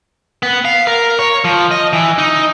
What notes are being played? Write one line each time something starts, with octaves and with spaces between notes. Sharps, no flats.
B3
F5
A#4
C#5
F3
D#5
E3
D#4